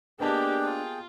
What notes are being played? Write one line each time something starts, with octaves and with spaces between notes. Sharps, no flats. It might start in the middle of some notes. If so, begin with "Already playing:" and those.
A#3 B3 D4 G4 G#4 D#5 G5 A5
F4